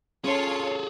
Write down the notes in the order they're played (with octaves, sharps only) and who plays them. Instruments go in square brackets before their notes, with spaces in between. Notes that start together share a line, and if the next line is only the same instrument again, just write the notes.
[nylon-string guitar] C#4 [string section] F4 C#5 [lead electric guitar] G#4 A4